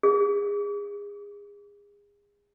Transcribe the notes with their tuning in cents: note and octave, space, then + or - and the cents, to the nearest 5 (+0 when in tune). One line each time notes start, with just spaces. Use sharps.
G#4 -30